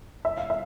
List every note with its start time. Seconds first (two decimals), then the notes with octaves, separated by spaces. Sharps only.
0.25 E5
0.38 F5
0.50 E5